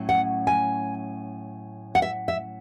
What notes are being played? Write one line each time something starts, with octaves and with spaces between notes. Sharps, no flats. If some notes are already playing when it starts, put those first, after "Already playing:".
Already playing: A2 F#3 C#4
F#5
G#5
F#5
E5
E5